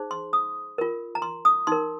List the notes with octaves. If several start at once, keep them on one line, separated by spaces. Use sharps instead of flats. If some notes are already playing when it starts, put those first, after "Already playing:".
Already playing: D#4 G#4 C5
C6
D#6
F4 A#4
A#5
C6
D#6
D#4 A#4 C6